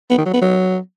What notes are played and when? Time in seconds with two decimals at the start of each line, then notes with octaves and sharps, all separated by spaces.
0.10 B3
0.18 D#3
0.26 F#3
0.33 B3
0.41 F#3